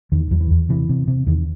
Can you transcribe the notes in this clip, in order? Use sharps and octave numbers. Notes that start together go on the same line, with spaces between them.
E2 D#3
E2 F#3
E3
E2
C3 E3
C3
C3
E2 D#3